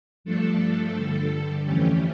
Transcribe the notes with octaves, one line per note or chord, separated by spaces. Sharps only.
G2 F3 A3 D4 A4
G2 D3 G3
F2 E3 A3 C#4 G4